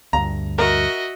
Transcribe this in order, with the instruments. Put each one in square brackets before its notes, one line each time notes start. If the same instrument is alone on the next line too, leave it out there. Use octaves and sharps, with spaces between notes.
[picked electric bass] D2 G2 [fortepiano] A#5
[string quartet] F#4 D#5 E5 [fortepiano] A#4